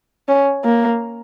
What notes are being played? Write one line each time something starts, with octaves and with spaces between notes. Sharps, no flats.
C#4
A#3